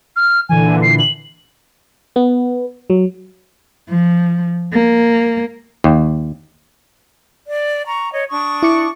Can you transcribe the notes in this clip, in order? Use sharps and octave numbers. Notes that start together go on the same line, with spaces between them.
F6
A#2 D3 E3 G#5
C7
F#7
B3
F#3
F3
A#3
D#2
D5
A#5 C#6
C#5 D#5
D4 C#6 D#6
E4 D6 C#7